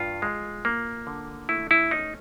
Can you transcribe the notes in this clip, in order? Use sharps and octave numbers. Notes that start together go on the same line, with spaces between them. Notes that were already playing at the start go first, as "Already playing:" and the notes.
Already playing: G2 F4
G#3
A#3
D3
A3 E4
E4
C#4 D#4